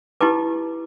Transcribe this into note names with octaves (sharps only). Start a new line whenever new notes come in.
E4 G4 B4 A5 D6